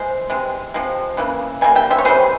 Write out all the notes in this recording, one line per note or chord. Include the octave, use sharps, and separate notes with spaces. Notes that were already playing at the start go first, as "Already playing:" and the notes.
Already playing: E3 G#3 G#4 C5
C3 E3 G#3
C3 F3 G#3
C#3 E3 A#3
E3 G3 A#3 G#5
E5 G5
C5 E5
C#5
C3 E3 G3 G#4 C5